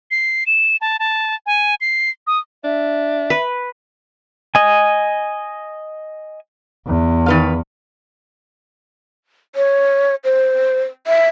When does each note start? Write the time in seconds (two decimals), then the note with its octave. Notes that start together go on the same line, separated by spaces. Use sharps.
0.11 C7
0.47 E7
0.81 A5
0.99 A5
1.46 G#5
1.81 C7
2.27 D#6
2.64 D4 E5
3.30 B4
4.55 D#5 G#5
6.87 E2
7.26 D#3 B4 F5
9.56 C#5
10.24 C5
11.07 E5